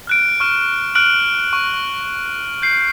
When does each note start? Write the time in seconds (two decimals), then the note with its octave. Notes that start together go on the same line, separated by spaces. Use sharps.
0.07 F6 F#6 D7
0.40 C#6 F6 E7
0.95 F6 F#6 D7 F#7
1.53 C#6
2.62 G6 C7